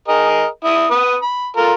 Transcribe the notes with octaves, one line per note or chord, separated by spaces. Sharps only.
G#4 A#4 D#5
E4 D#6
B4 D#6
B5
F4 A4 A#4